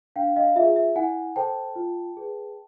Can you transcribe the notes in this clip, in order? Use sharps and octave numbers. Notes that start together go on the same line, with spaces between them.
D4 F5 G5
D#5 F5
F4 G#4 E5
E5
E4 F#5 G#5
A4 C5 G5 A5
F4
G#4 B4